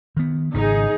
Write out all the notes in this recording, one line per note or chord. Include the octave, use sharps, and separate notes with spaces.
D#3 B3
G#1 C#3 D#4 G#4